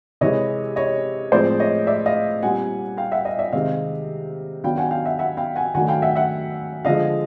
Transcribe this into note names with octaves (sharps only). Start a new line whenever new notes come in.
C3 E3 G#3 C#5 D#5
C#5 D#5
A2 F3 G#3 C4 C5 D5
C#5 D#5
D5 E5
D#5 F5
A#2 G3 C4 F#5 G#5
F5 G5
E5 F#5
D#5 F5
D5 E5
C3 D#3 G#3 C4 D#5 F5
D#3 F#3 B3 D4 F5 G5
F#5 G#5
F5 G5
E5 F#5
E5 F#5
F5 G5
F#5 G#5
D#3 F#3 A3 D4 F#5 G#5
F5 G5
E5 F#5
E5 F#5
D3 F3 G#3 D#5 F5